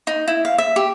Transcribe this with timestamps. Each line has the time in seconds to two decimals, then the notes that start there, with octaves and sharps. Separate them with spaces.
0.07 D#4
0.28 E4
0.45 F5
0.58 E5
0.76 G4